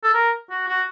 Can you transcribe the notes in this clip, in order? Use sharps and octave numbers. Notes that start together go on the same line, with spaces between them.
A4
A#4
F#4
F#4